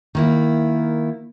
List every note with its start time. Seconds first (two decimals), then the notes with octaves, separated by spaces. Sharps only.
0.15 D#3 A#3 E4